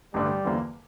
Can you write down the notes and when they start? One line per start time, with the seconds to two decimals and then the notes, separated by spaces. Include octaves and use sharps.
0.14 A1 G2 D3 G3 A3 D4
0.45 E2 D3 F3 A#3 E4